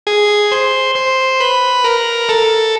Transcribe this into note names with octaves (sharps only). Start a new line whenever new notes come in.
G#4
C5
C5
B4
A#4
A4